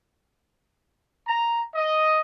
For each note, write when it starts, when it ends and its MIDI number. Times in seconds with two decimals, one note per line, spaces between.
1.27 1.63 82
1.75 2.20 75